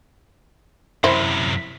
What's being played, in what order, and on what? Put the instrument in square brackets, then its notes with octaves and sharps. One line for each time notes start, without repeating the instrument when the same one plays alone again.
[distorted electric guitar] F#2 C3 [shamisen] E4 C5